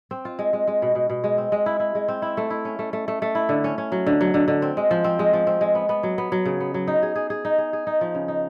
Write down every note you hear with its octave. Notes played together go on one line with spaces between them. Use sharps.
C4
F4
G#3
G#3
G#3
B2
B2
B2
G#3
C4
G#3
E4
E4
G#3
C4
E4
A3
E4
C#4
A3
A3
A3
A3
E4
D3
C#4
C#4
F#3
D3
F#3
D3
D3
C4
G#3
F3
C4
G#3
F3
C4
G#3
B3
B3
F#3
B3
F#3
C#3
B3
F#3
D#4
G#4
G#4
G#4
D#4
G#4
G#4
D#4
F3
C#3
D#4